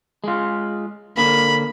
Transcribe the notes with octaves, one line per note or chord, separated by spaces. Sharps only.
G#3 F4
D3 A#3 B5